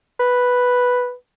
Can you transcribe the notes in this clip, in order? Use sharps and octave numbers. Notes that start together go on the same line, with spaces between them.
B4